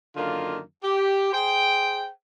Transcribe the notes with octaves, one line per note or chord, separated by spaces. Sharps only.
F#2 D3 D#3 A#3 F4
G4
G#4 C5 G5